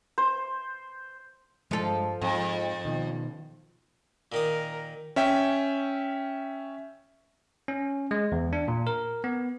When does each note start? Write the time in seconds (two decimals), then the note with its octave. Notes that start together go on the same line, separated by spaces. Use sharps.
0.18 C5
1.71 G2 F3 G#3 A4
2.22 F2 G#2
2.85 B2 D#3
4.32 A#2 D#3 A#4 D#6
5.16 C#4 E5 G5
7.68 C#4
8.11 G#3
8.32 E2
8.53 D4
8.68 A#2
8.87 A#4
9.24 B3